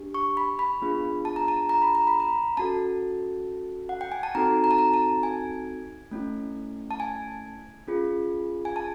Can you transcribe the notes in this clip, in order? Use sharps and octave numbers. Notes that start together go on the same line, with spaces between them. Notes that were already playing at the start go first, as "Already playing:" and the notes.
Already playing: D4 G4
C#6
B5
B5
B3 D4 F4 G#4
A5
A#5
A5
A#5
B5
A#5
B5
A#5
C#4 F#4 A4 A5
F#5
G5
G#5
A5
C4 D#4 F#4 A4 A#5
A#5
A5
A#5
A5
G#5
A3 C#4 E4
A5
G#5
C#4 F4 G#4
G#5
A5